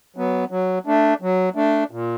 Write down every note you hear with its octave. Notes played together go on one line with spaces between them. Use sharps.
F#3 B3
F#3
A3 D4
F#3
A3 D4
A#2